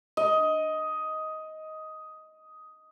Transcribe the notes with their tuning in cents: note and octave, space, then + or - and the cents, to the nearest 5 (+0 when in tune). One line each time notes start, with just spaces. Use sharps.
D#5 +10